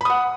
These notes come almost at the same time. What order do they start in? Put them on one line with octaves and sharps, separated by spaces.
B5 D#6 F#5